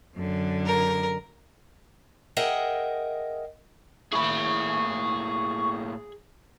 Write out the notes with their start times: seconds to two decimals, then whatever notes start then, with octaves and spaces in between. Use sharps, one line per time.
0.16 F#2 D3
0.66 A#4
2.37 G#4 A#4 D#5 E5 F#5 G5
4.13 A2 A#3 E4 G#4 B5 C#6